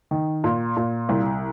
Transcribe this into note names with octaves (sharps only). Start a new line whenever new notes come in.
D#3
A#2
A#2
C2